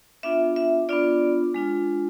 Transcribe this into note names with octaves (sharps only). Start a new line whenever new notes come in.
B3 D4 F4 E5
E5
B3 D4 F4 D5
G#3 D4 F4